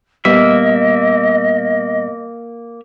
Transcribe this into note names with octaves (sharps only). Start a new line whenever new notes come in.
A#2 G3 A#3 B3 D#5 E5